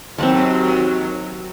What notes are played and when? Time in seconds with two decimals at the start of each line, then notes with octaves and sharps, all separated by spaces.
0.18 D#2 F#3 C4 F#5 A5